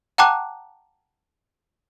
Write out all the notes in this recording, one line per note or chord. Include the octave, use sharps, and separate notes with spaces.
F#5 G5 A5 A#5 D6 F#6